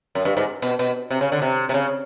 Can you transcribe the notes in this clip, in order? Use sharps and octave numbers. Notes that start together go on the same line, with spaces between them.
F#2
G2
G#2
B2
B2
C3
C#3
D3
C3
C3
C#3